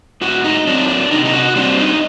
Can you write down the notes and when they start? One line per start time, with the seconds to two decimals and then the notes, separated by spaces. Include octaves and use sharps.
0.21 A2 F#4
0.44 D#4
0.67 F#3 C4 D4
0.88 D4
1.11 C3 D#4
1.25 D#4
1.33 F#4
1.56 G3 C4 D4
1.79 D#4